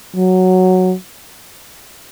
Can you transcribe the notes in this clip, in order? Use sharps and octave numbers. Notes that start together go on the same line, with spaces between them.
F#3